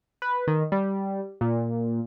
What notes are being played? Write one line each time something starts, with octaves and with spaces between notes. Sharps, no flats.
B4
D#3
G3
A#2